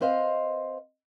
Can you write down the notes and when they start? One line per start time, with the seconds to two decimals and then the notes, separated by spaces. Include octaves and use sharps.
0.01 C4 B4 C5 D#5 F5